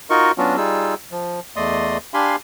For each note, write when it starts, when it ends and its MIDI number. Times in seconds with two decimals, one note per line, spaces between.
0.10 0.32 63
0.10 0.32 65
0.10 0.32 66
0.10 0.32 70
0.10 0.32 75
0.10 0.32 85
0.38 0.57 54
0.38 0.57 59
0.38 0.57 61
0.38 0.57 62
0.38 0.57 65
0.38 0.57 66
0.57 0.94 55
0.57 0.94 63
0.57 0.94 65
0.57 0.94 68
0.57 0.94 88
1.12 1.40 53
1.56 1.98 40
1.56 1.98 57
1.56 1.98 74
1.56 1.98 75
1.56 1.98 84
1.56 1.98 87
2.14 2.36 62
2.14 2.36 67
2.14 2.36 77
2.14 2.36 80
2.14 2.36 83
2.14 2.36 84